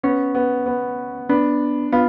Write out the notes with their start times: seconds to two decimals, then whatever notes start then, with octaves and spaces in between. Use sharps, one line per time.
0.03 B3 C#4
0.35 B3
0.66 B3
1.29 B3 D4
1.92 B3 F4